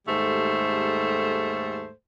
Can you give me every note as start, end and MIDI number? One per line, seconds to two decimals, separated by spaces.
0.07 1.90 39
0.07 1.90 44
0.07 1.90 55
0.07 1.90 57
0.07 1.90 69
0.07 1.90 72